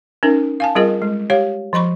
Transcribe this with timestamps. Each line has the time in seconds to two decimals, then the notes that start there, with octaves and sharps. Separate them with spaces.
0.23 C#4 D#4 A#4
0.60 F5 G#5 A5
0.75 G3 C4 F4 G#4 A#4 D#5
1.02 G#3
1.30 G4 C#5 F5
1.73 F3 D#5 B5 C#6